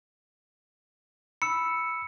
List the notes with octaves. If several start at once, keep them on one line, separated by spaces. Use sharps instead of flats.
B5 E6 C#7